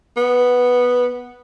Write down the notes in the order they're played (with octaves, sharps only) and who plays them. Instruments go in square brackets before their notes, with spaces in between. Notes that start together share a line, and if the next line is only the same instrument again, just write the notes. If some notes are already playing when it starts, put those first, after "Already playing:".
[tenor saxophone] B3